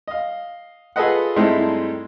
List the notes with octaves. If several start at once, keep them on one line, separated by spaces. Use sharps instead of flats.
D#5 F5
F4 G#4 A4 B4 D#5 F#5
G2 G#3 A3 C4 D#4 E4